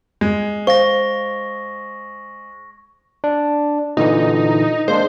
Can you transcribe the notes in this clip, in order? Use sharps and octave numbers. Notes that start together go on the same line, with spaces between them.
G#3
C5 F5 C#6 A#6
D4
A#2 D3 E3 D#4
G#3 A#3 D4 C5